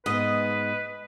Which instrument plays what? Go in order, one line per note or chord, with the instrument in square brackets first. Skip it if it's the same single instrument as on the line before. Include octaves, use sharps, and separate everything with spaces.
[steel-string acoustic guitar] G#2 B3 [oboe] B4 [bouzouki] D#5